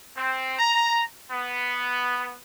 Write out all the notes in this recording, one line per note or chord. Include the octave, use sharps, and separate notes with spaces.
C4
A#5
B3